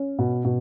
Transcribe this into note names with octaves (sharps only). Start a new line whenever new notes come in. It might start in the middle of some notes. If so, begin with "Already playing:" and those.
Already playing: C#4
B2
B2